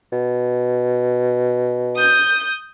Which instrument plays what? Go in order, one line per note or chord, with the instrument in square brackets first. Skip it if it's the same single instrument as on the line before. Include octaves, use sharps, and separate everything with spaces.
[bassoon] B2
[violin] D#6 G6